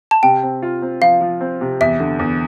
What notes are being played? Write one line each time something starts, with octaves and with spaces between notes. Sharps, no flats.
A5
C3 G5
C4
F4
C4
F3 F5
F3
C4
C3
E2 E5
D3
E2